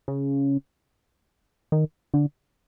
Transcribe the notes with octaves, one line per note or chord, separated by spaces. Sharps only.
C#3
D#3
D3